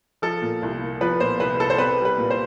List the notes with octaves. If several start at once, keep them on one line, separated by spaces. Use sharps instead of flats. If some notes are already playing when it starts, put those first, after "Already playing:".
F3 A4
A#2
C2
A#3
F3 B4
A#2 C5
C2 B4
A#3 A4
C5
C4 B4
G3
B4
A#2
C5